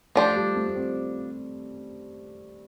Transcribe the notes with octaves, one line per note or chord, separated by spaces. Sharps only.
F3 A3 D4 G4 C5
G3
A3
A3
C4